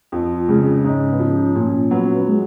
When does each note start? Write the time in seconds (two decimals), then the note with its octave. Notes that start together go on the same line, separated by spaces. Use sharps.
0.12 F2 F3
0.49 C#3 G#3
0.84 G#2 C#4
1.12 B3
1.20 F3 C#4
1.56 A#2 C#4
1.91 F#3 B3
2.03 C#4
2.15 B3
2.27 G#3